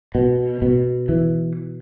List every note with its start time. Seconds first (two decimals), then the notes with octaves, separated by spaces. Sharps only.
0.15 B2
0.62 B2
1.09 E3